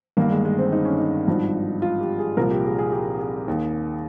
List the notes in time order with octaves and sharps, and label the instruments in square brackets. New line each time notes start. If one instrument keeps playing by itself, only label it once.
[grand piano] G1 G2 D#3 A#3
G#3
G#3
C4
D#4
C#4
D#4
G#1 G2 F3
F4
G4
G#4
C2 A#2 F3 A#4
G4
G#4
G#4
G4
G#4
D#2 D#3